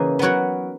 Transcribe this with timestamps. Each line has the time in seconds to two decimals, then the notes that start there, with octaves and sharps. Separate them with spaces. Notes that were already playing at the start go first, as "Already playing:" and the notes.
Already playing: C#3 E3 A#3 D#4
0.19 F#3 B3 F#4 A#4 C#5